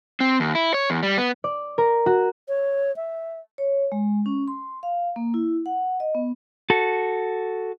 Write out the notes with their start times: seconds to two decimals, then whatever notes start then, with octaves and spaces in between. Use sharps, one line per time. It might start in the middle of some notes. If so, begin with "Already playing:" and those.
0.20 C4
0.40 D#2
0.55 E4
0.74 C#5
0.90 E2
1.03 G3
1.18 B3
1.44 D5
1.78 A#4
2.06 F#4
2.48 C#5
2.96 E5
3.58 C#5
3.92 G#3
4.26 C#4
4.48 C6
4.83 F5
5.16 A#3
5.34 E4
5.66 F#5
6.00 D#5
6.15 B3
6.70 F#4 A4